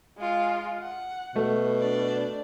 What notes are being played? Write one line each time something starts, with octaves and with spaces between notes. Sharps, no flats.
G#3 F4
F#5
B2 A3
D4 D5